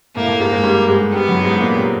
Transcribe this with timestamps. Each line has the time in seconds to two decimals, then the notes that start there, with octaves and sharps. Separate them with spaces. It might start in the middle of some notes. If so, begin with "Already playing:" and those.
0.15 A2 A3 A#3
0.28 A2 A3
0.40 G#2 G#3
0.52 G#2 G#3
0.63 G2 G3
0.88 G#2 G#3
1.12 G2 G3 B3
1.28 F#2 F#3
1.44 G#2 G#3
1.60 A#2 A#3
1.76 C3 C4